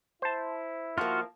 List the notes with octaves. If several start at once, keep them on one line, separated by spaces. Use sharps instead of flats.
E4 C5 A5
F3 A#3 F4 F#4